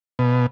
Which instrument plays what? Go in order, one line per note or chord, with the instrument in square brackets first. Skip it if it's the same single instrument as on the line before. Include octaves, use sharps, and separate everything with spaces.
[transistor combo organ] B2